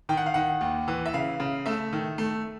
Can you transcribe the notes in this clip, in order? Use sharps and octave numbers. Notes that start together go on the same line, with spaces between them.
D#3 G5
F#5
F5
D#3 F#5
D#2
E3
E5
C#3 F5
C#3
A3 E5
D#3
A3